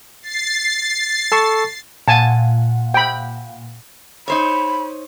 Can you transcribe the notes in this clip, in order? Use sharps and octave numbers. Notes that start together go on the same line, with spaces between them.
A6 C7
A4 A5 C#6
A#2 F5 F#5 G#5 A5
G5 B5
D#4 C5 C#5 B5